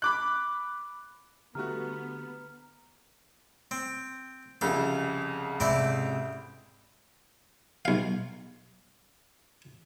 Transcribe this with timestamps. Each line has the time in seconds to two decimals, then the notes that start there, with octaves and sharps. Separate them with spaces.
0.02 B5 D6 F#6
1.55 D3 G3 A3 B3 F#4 A#5 F6
3.71 C4
4.61 C2 F2 C#3 A4
5.60 G#2 C3 C4 E4 D5
7.85 B1 F5